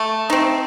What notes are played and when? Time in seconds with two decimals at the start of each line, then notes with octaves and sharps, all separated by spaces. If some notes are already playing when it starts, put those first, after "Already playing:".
Already playing: A3
0.30 C4 D#4